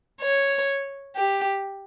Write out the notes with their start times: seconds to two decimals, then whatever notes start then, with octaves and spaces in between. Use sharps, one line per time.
0.22 C#5
1.16 G4